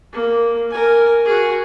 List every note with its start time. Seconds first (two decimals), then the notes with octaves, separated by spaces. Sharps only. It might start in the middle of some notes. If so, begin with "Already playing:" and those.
0.13 A#3
0.70 A#4 G#5
1.25 F#4 G#4